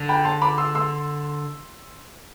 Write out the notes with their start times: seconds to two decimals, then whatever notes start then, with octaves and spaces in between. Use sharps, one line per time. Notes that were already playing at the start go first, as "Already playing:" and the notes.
Already playing: D3
0.09 G5 B5
0.25 A5 C6
0.41 B5 D6
0.58 C6 E6
0.75 C6 E6